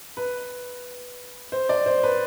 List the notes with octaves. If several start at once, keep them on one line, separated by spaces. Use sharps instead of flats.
B4
C5
D5
C5
B4